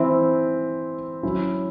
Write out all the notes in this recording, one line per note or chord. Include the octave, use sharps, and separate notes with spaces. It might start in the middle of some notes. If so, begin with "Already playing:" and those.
Already playing: E3 C4 E4
F#3 C#4 E4